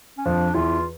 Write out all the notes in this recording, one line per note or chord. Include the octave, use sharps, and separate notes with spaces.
C#4
F2 F3 D4
E2 E3 F4